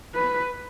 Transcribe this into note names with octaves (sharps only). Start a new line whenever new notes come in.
B4